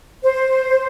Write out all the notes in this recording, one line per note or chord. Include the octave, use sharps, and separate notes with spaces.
C5